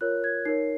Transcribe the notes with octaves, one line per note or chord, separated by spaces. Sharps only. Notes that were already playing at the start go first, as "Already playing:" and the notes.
F4 A#4 C#5 F#6
G#6
D#4 A#4 C#5 C7